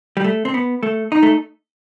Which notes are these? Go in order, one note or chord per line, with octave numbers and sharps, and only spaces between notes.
G3
A3
C4
B3
A3
D#4
A3